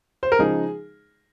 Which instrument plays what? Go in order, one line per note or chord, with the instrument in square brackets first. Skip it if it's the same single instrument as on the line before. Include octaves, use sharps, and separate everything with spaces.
[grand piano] C5
A#4
C#3 F3 G#3 D#4 G#4